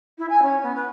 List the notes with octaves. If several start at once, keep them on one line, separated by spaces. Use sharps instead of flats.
E4
G#5
C#4
B3
B4